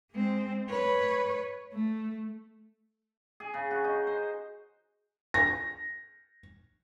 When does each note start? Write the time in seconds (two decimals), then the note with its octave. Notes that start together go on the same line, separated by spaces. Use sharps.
0.12 G#3 C4
0.70 B4 C#5
1.73 A3
3.40 G#4
3.54 C#3
3.71 F#4
3.84 D#4
4.07 C5
5.34 A#6